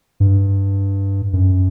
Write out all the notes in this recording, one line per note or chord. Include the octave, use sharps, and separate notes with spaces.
G2
F#2